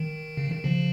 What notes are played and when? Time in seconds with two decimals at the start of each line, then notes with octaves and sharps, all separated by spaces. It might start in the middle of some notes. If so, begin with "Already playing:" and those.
Already playing: D#3
0.37 C#3
0.52 D#3
0.64 C#3 F3